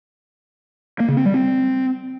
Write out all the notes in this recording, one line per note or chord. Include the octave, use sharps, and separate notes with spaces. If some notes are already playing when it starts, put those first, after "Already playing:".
A#3
C#3
C4
G3
C4